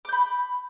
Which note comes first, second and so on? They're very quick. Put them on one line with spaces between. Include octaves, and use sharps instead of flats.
D6 G6 B5